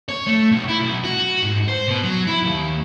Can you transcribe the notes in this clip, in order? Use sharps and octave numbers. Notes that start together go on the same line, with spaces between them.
C#5
A3
B1
E4
B1
F#4
G#2
C5
B2
F#3
E4
D#2